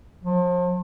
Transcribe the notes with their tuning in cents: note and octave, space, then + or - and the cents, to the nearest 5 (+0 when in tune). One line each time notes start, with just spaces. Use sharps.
F3 +35